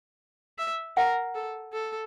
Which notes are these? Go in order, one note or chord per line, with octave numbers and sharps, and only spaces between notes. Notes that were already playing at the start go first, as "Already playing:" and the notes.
E5
A#4 F#5
A4
A4